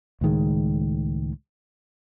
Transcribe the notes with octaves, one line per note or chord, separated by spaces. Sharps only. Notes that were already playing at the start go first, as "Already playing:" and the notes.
C#2 A2 D#3 G#3